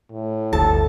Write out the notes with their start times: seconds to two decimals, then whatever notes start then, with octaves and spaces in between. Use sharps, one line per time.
0.11 A2
0.53 G1 D2 A4 A5